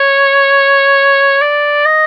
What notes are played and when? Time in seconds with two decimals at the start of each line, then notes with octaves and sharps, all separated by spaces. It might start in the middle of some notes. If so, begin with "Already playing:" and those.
Already playing: C#5
1.41 D5
1.85 D#5